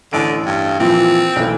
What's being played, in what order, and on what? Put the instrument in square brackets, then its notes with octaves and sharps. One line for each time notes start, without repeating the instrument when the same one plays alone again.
[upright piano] A1 D7 [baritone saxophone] D3
[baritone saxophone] G2
[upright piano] A#2 E3 F3 [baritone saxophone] C4
[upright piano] B1 E3 A3